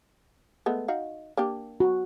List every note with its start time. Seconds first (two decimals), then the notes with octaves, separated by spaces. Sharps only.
0.66 G#3 A3 B3
0.88 D#4 F#4 F5
1.37 A#3 D4 G4
1.80 F#4